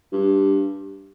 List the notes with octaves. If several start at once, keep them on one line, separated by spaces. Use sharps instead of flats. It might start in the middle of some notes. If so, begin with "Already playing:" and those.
G2